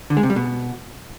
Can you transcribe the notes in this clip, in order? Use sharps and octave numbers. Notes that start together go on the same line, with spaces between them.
D3
G#3
C3
G3
B2